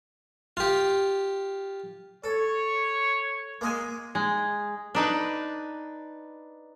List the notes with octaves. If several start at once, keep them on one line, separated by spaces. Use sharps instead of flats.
F4 G4
A4 C#5
G#3 A#3 D#5 G#5
G#3
D4 D#4 B4